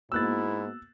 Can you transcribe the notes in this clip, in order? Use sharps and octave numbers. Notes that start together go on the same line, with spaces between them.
G#2 A#3 B3 E4 F#4 E6 F#6 A6